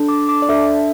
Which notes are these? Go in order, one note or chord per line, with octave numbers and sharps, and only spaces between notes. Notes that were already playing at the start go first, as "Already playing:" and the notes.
Already playing: D4 A4
D6
D6
D5
D4 A4 E5